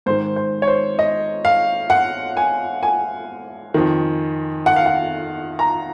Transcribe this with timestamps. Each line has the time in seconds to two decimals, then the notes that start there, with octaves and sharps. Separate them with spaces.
0.06 G#2 D#3 C5
0.36 C5
0.62 C#5
0.68 C5
0.99 D#5
1.45 F5
1.90 F#5
2.37 G#5
2.83 G#5
3.74 F2 D#3
4.66 F#5
4.76 F5
4.86 F#5
5.59 A#5